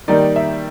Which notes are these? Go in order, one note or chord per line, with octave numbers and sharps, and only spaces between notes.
D#3 G3 A#3 D#4 D5
E5